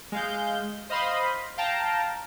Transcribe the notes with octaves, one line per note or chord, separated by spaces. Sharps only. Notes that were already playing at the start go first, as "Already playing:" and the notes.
G#3 F5 G6
C5 D#5 F5 B5 C6 D#6
F5 G5 A5 A#5